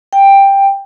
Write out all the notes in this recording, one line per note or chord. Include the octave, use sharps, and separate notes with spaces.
G5